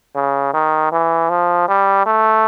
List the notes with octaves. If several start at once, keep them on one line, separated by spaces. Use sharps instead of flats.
C#3
D#3
E3
F3
G3
A3